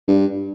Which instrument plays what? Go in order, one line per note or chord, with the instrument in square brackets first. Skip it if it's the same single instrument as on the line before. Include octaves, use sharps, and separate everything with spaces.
[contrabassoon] G2